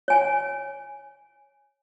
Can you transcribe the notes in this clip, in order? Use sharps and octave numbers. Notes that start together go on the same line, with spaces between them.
C#5 G#5